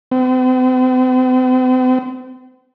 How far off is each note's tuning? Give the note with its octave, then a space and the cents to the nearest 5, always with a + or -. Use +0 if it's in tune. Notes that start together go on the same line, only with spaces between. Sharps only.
C4 -45